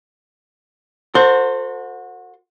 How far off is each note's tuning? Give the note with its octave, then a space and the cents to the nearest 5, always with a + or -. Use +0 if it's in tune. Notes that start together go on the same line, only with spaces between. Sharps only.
F#4 -25 A4 +45 C5 +0